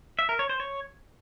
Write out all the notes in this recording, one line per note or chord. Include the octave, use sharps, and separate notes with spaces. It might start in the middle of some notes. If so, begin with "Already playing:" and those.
E5
A#4
C#5
C5
C#5